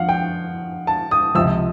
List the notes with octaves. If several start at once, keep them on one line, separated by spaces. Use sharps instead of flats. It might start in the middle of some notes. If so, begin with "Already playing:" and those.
Already playing: F2 D3 F3 F5 F#5
G5
A5
D#6
C#2 C3 F3 E6